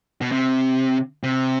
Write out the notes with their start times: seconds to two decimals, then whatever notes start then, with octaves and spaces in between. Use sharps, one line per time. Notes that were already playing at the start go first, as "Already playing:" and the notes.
0.21 B2
0.32 C3
1.23 C3